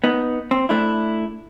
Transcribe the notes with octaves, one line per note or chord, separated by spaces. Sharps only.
B3 D#4
C4
A3 D4 E4